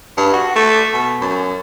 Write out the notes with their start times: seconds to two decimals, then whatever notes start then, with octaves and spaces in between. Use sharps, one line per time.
0.17 G2
0.33 F#4
0.56 A3
0.93 B2
1.21 F#2